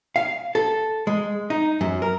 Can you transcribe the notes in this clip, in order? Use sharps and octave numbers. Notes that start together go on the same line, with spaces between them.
F5
A4
G#3
D#4
F#2
A#4